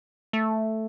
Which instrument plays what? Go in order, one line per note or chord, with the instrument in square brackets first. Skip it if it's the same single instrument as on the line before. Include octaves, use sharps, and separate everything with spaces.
[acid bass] A3